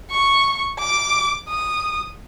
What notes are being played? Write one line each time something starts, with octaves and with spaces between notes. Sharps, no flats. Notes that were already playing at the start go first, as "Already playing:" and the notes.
C#6
D6
D#6